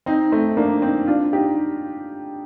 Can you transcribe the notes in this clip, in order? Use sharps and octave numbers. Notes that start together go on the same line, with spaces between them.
C4 D#4
A3 C4
A#3 D4
C4 D#4
D4 F4
D#4 G4